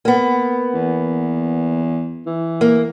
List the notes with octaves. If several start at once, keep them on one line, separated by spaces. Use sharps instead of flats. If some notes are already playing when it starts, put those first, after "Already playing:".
A#3 B3
E2
E3
A#3